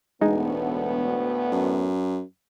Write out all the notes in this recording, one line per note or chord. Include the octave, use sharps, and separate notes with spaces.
E1 D2 A2 G#3 B3 D#4
F#2